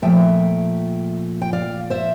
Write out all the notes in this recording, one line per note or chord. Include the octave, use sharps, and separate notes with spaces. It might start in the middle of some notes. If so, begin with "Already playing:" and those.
A#2 F3 A3 E5 G5
G5
D5 F5
C5 E5